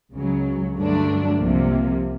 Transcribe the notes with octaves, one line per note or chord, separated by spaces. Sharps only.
C#2 C#3 F#3
G2 D3 F#3 A3 D4
C2 C3 F3 A#3